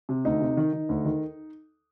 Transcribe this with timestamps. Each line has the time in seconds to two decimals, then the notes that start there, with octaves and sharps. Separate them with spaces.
0.09 C3
0.25 D2 D#4
0.41 C3
0.57 D#3
0.73 D#3
0.89 D2
1.05 D#3